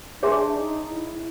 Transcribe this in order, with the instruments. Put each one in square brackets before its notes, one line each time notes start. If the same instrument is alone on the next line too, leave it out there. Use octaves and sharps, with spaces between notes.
[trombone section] D4 [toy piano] G#4 C#5 E5 G#5 C6
[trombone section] D#4
E4